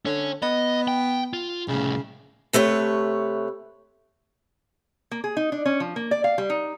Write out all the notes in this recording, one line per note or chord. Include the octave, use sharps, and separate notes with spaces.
D3 C#4 C#5
B3 D#5
G5
F4
C2 A2 C#3
C3 A3 B4 C#5
A#3
G#4
D#4
D4
C#4
F3
A#3
D5
F5
G3
D#4